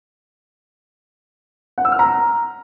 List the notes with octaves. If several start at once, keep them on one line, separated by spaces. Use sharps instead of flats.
F#5
E6
F6
A#5